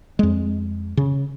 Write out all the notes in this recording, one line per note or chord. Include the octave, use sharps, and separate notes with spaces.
F2 G#3
C#3